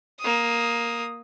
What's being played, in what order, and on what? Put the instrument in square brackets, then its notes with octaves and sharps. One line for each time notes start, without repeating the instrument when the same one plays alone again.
[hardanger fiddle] A#3 D#6